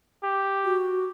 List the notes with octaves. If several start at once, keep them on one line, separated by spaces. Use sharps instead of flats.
G4
F#4